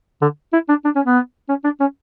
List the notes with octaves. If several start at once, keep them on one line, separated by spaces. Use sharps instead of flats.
D3
E4
D4
D4
C#4
B3
C#4
D4
C#4